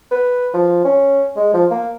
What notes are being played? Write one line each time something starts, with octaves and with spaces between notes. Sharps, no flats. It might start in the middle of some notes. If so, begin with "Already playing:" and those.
B4
F3
C#4
G#3
F3
A#3